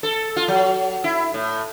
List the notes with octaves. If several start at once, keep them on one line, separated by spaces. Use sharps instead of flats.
A4
F4
F#3
E4
A2